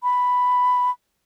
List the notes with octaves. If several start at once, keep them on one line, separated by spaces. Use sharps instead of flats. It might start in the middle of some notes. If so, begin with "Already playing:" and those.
B5